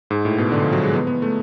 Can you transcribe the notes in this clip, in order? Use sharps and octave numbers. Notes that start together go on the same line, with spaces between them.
G#2
A2
B2
D3
F3
F#3
G#3
B3
B3
A3